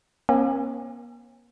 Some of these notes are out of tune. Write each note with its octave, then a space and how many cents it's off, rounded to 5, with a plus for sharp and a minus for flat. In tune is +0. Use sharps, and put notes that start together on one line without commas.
A#3 +40 C#4 -40